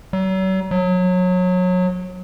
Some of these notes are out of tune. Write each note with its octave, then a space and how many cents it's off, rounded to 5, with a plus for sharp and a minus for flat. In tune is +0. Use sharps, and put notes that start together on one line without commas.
F#3 +40
F#3 -25